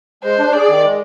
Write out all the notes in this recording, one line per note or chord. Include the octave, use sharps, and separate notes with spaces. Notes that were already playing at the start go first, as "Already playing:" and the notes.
G#3 C5
D4
G#4 D5
D#3
G#3